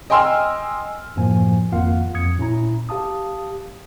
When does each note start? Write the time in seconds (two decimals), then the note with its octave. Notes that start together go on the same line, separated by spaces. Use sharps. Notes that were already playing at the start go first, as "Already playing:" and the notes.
0.10 D#5 G5 G#5 C6 E6 F6
1.16 F#2 A2 F3 A#3 G#5
1.72 G#1 F2 A#3 F4 F5 F#5
2.14 F2 D#6 G#6 C#7
2.38 A#2 C#4 E4 A#5
2.89 G4 F5 A5 D#6